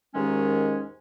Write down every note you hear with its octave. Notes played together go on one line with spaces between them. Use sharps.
D#2 G#2 D#3 G#3 C#4